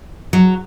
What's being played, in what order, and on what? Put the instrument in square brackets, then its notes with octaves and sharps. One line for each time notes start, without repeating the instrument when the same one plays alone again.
[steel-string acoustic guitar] F#3